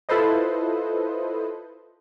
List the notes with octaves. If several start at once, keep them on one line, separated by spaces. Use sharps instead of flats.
E4 F4 A4 B4 C5 D#5